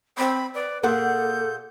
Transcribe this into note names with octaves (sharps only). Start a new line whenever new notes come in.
C4 B5
B4 D5
A#2 A#3 G#4 A4 F#5 G6